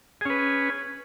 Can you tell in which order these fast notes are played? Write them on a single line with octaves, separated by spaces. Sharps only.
G#4 C#4 B4